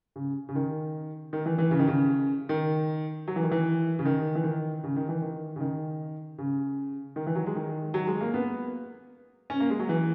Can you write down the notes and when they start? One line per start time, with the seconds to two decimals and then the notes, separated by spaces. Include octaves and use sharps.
0.16 C#3
0.49 C#3
0.55 D#3
1.33 D#3
1.46 E3
1.58 E3
1.71 C#3
1.79 D#3
1.87 C#3
2.49 D#3
3.28 F#3
3.36 E3
3.43 D#3
3.51 E3
3.99 C#3
4.05 D#3
4.35 E3
4.44 D#3
4.84 C#3
4.96 D#3
5.09 E3
5.22 D#3
5.56 C#3
5.60 D#3
6.38 C#3
7.16 D#3
7.27 E3
7.35 F#3
7.46 G#3
7.55 D#3
7.94 F#3
8.07 G#3
8.20 A#3
8.34 B3
9.50 C#4
9.60 A#3
9.70 G#3
9.79 F#3
9.89 E3